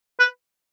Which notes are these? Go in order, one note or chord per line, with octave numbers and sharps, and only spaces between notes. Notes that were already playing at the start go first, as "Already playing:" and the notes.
B4